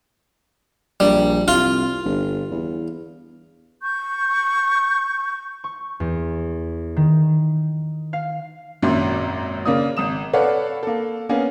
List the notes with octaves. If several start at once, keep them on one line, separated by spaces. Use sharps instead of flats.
A#1 G3
C2 F4
G1
E2
C#6 G6
C#6
E2
D#3
F5
G#1 F#2 A#2 E5 C6
C#3 A#3 D5 D#6
G#1 D#6 E7
A4 B4 C#5 D5 F5 F#5
A#3 A4
A#3 B3 C#4 G#4